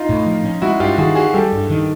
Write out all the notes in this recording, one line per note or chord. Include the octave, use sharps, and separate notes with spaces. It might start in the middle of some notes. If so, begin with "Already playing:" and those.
Already playing: D#4 F4
A2
F3
C#4
G#3 E4 F#4
G2 F4 G4
D#3 F#4 G#4
C#4 F#4 G#4
G3 G4 A4
G2
D#3